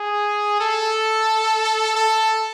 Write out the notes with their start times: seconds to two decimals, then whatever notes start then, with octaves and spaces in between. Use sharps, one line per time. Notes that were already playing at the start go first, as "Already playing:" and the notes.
Already playing: G#4
0.61 A4
1.96 A4